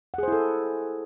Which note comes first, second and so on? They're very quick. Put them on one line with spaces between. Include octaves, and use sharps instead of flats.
F#5 G#4 C5 E4 A4